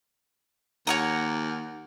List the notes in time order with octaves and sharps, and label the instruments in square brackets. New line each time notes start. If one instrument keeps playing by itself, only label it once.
[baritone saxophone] D#2 [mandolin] C#5 F#5 A#5